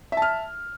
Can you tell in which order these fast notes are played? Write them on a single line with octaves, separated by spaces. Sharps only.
E5 A5 F6